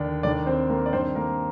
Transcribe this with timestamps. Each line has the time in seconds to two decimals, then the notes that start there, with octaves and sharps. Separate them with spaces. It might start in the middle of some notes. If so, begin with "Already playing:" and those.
Already playing: D#2 D3 D4
0.23 D#2 D#3 D4 D5
0.46 C4 C5
0.70 A#3 A#4
0.86 D5
0.93 G2 D#3 C4 C5
1.15 A#3 A#4